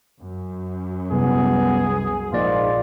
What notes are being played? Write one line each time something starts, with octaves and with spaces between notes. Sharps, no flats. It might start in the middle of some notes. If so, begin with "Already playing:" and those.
F#2
C2 B3 G#4
A#1 G#2 A#3 F4 D5